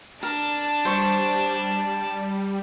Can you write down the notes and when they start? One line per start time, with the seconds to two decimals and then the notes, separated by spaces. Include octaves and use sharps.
0.23 D4 A#4 D5 A5
0.85 G3 C5 C#6